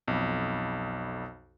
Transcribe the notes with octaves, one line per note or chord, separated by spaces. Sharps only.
B1 F2